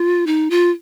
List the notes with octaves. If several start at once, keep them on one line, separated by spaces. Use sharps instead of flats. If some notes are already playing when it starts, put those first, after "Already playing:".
Already playing: F4
D#4
F4